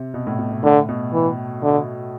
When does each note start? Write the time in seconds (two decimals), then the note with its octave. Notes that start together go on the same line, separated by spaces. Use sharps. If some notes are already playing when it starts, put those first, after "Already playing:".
Already playing: C3
0.14 B2
0.27 A2
0.39 B2
0.51 B2
0.64 A2 D3
0.89 B2
1.13 E3
1.63 D3